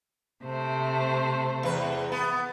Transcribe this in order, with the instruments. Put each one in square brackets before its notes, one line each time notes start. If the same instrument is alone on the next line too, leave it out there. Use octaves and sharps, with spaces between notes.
[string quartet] C3 A3 C5
[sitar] E2 B4
B3